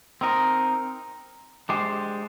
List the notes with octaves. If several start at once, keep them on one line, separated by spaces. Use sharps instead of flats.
C4 D#4 A#4
G#3 D4 G4 C5